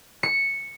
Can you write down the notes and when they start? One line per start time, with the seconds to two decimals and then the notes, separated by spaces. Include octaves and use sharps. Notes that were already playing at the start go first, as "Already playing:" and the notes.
0.23 C#7